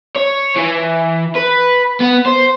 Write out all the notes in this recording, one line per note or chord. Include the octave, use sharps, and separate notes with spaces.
C#5
E3
B4
B3
C5